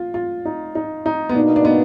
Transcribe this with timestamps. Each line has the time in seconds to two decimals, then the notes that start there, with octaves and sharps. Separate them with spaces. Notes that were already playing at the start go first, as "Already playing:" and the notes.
Already playing: F4
0.14 F4
0.45 D#4
0.75 D#4
1.06 D#4
1.29 B3
1.35 B2 A#3 D4 D#4
1.56 D4
1.65 B3